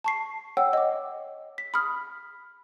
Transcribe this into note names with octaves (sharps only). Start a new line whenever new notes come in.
A5 C#6 C7
C#5 F#5 G5 E6
D#5 D6
B6
B5 D#6 F6